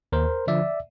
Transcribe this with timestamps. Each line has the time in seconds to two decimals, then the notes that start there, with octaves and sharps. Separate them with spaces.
0.12 D#2 A#4 C5
0.47 D3 F3 D5 E5